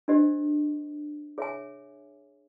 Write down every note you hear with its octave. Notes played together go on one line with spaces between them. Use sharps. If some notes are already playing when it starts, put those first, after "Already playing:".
D4 G4 C5 D#5
G#4 C#5 E5 G#5